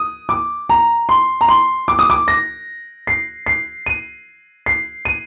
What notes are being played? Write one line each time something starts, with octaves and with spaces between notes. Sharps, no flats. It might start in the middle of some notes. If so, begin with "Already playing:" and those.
Already playing: D#6
D6
A#5
C6
A#5
C6
D6
D#6
D6
A#6
C7
C7
D#7
C7
D#7